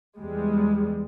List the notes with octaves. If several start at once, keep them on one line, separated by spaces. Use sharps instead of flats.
E2 G3 G#3